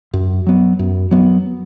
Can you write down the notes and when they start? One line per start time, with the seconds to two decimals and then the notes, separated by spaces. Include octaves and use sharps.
0.14 F#2
0.46 F#3 B3
0.79 F#2
1.11 F#3 B3